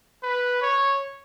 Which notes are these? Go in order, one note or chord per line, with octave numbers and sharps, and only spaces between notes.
B4
C#5